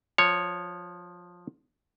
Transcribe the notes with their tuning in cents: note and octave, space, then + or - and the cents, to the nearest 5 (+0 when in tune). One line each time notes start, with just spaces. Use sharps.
F3 +15 C#5 +0